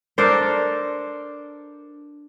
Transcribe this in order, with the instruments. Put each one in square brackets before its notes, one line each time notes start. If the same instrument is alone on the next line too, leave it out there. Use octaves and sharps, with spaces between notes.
[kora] D4 A4 A#4 C5